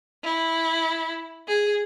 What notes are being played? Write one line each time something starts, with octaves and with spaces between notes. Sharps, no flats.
E4
G#4